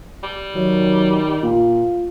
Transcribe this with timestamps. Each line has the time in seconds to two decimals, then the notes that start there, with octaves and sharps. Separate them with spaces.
0.23 G3
0.55 D#3 F#3
1.43 A#2 F4